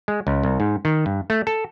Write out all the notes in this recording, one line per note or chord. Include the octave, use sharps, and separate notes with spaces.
G#3
C#2
C2
G#2
D#3
G2
A3
A4